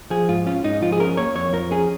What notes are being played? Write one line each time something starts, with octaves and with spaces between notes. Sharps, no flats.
F3 G#4
G#2 F4
C#4 F4
G#2 D#4
F3 F4
G#4
C#4 A#4
A#3 C#5
F2 C#5
F3 A#4
C#4 G#4